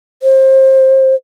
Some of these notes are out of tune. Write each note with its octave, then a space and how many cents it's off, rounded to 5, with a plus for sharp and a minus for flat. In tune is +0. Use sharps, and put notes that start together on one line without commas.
C5 +25